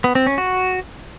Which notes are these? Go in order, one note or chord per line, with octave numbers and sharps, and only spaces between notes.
B3
C4
C#4
F#4